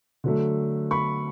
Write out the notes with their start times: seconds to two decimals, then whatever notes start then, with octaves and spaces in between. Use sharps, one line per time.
0.24 D3 F#3 A3
0.91 B5 C#6